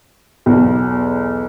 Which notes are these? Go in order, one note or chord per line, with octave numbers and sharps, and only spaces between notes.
B1 E2